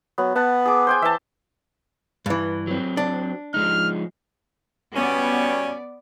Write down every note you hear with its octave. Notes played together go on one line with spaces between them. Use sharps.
F#3 B3
B3 F#5 A5
G#4 D6
C5 G5 G#5
E3 E5 A5
G2 E3
F#3 C4
D4
F3 G#3 D#4 F6
B2 G3 B3 C#4 D5